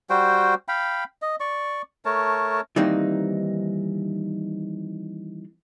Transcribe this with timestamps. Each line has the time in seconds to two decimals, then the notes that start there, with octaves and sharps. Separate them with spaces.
0.10 G3 F#4 C5 G5
0.68 F5 G5 B5
1.22 D#5
1.40 D5 C#6
2.05 A3 A#4 C#5 A5
2.76 D#3 E3 G3 A#3 C4 D#4